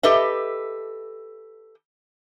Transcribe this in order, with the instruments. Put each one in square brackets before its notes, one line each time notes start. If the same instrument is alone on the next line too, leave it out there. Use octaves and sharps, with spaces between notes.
[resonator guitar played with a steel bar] G4 A4 B4 D#5 E5